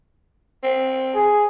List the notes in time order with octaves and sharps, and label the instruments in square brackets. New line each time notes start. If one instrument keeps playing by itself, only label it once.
[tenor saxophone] C4
[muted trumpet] G#4